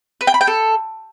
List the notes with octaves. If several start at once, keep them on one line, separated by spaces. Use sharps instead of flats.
B4
G5
B5
G5
A4